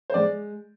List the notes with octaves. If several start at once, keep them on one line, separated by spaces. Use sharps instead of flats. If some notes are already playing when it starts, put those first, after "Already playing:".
C5
G#3 D5